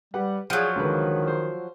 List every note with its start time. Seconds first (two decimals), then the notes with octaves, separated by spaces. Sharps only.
0.14 G3 G4 B4 F#5
0.50 F3 F#3 G#4 F#5
0.75 C#2 D3 D#3 B4
1.28 C5